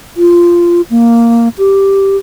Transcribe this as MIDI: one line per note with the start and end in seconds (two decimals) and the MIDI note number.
0.17 0.81 65
0.90 1.49 58
1.58 2.17 67